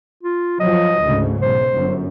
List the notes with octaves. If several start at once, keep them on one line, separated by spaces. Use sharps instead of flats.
F4
F3 F#3 D#5
D2 G#2 C#3
B1 C5
G1 F#2